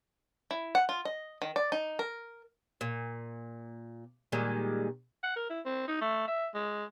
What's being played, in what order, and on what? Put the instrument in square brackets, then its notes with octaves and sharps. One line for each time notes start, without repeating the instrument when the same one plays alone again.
[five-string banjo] E4
F#5
F4
D#5
D#3
D5
D#4
A#4
[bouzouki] A#2
A#2 D#3 G3 G#3
[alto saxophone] F#5
A#4
E4
C4
D#4
A3
E5
G#3